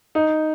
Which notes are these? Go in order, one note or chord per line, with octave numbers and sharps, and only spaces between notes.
D#4